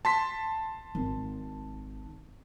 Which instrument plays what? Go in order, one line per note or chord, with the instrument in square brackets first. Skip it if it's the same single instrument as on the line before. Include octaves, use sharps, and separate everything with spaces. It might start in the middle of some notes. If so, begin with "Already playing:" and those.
[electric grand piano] A5 C6 B6
[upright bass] G#1